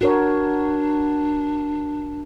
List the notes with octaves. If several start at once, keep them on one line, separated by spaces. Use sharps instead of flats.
D4 F#4 A#4 C#5